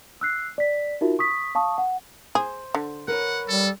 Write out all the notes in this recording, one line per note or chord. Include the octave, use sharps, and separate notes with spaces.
E6 F#6 C7
D5 B6
D#4 F4 F#4 A#4 E5
C#6 D#6 B6
F5 A5 C#6 D#6
F#5
G#4 C5
D3
A#4 B4 C#5 F#5
G3 A4